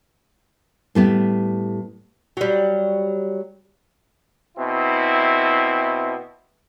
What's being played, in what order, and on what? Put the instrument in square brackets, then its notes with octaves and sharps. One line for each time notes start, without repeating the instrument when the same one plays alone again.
[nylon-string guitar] A2 G3 B3
[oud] F#3 G3
[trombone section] B2 C4 E4